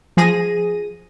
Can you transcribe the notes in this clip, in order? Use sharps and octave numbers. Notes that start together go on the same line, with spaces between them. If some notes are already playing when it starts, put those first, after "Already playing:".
F3 G#4 A#6 D#7